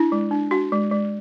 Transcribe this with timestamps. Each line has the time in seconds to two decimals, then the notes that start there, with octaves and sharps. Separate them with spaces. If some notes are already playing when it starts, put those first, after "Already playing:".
Already playing: D4 E4
0.12 G#3
0.31 D4
0.51 D4 F#4
0.72 G#3
0.91 G#3